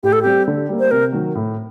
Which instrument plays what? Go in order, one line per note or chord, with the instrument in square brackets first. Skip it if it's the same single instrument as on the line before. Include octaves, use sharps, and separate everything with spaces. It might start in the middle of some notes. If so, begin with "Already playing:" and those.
[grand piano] A2 [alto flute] G4
[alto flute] A4
[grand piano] G3 C4 [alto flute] G4
[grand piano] D3
G3 A#3
[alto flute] C5
[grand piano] C3 [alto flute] A#4
[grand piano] D#3 F#3
A2